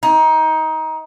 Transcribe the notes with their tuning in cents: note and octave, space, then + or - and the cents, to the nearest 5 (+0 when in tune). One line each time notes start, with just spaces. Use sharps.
D#4 +20